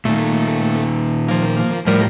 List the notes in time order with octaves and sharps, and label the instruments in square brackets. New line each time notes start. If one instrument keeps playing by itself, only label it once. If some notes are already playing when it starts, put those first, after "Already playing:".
[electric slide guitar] A#2 D#3 [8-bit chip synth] A3
[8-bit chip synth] F3 A#3
[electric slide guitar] A2 [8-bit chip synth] F3 G3 A#4